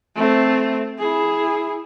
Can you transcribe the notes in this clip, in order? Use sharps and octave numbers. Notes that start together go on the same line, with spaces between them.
A3 C4
E4 G#4